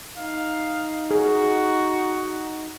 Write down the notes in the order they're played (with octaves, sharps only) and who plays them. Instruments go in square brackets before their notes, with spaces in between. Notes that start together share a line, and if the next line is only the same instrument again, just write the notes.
[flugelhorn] D#4 [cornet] F5
[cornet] F#4 [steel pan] G#4